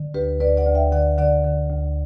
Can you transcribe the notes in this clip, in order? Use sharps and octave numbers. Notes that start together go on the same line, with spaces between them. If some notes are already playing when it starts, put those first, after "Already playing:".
Already playing: D3
D2 G4 B4
D2 B4 D5
D5 F#5
D2
E5 G5
D3 D5 F#5
D3 D5 F#5
D3
D2